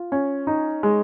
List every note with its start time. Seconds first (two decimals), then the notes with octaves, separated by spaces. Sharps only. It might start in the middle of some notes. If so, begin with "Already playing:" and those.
Already playing: F4
0.12 C#4
0.47 D#4
0.83 G#3